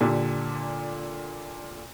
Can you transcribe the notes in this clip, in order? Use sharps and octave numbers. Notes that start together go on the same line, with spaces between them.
A#2 D3 G4